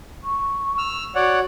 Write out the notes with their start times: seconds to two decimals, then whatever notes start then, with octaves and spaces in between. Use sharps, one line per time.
0.24 C#6
0.78 E6 F6
1.15 F#4 C#5 D5 F#5